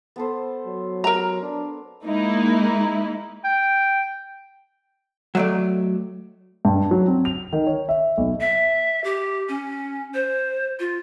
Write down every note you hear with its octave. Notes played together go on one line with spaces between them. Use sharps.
B3 A4 C5
F#3
A#4 A#5
D4
G#3 A#3 D#4 E4
G5
F#3 A3 D5
G2
F#3
C4
F7
D#3
C#5
E5
B1
E5
G4
C#4
C5
F4